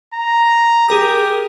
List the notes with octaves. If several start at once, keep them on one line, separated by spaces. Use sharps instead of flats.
A#5
G4 G#4 A#4 D#6